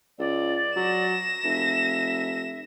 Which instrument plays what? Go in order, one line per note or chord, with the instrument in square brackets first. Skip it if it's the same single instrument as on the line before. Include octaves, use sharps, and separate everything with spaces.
[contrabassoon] C#2 [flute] D5
[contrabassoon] F#3 [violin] A#6 E7
[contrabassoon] F1 [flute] E5